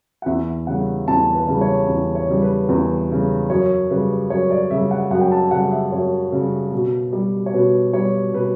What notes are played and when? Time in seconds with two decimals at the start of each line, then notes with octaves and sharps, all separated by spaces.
0.22 F#5
0.26 E2 E5
0.67 C#3 G3 F#5
1.08 E2 A5
1.34 B4
1.48 C#3 G3
1.61 C#5
1.88 E2
2.15 C#5
2.29 C#3 G3
2.42 B4
2.69 E2 B4
3.09 C#3 G3
3.49 F#2 C#5
3.90 C#3 G3 B4
4.30 F#2 C#5
4.51 D5
4.71 C#3 G3 E5
4.91 F#5
5.11 F#2 F#5
5.21 G5
5.32 A5
5.51 C#3 G3 F#5
5.71 E5
5.92 F#2 C#5
6.32 C#3 G3
6.72 B2
7.13 G3
7.46 C#5
7.53 B2 B4
7.93 G3 C#5
8.34 B2 B4